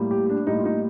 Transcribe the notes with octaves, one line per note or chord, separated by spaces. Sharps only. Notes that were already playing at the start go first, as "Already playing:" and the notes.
Already playing: A2 G3 A#3
G4
D4
A2 G3 A#3 D#4
F4
D#4